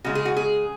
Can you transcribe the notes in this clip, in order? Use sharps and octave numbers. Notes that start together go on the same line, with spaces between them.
C#3 G#3 F#4
G#4
F#4
G#4